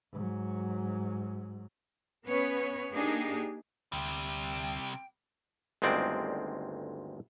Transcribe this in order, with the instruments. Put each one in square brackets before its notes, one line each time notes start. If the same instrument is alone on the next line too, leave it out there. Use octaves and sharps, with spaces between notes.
[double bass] G#2 F#3
[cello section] B3 C#4 B4 C#5
A#3 D4 D#4 G4 G#4
[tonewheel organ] D2 [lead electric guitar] C3 G3 [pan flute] G5
[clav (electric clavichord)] G1 D2 D#3 G#3 C4 D5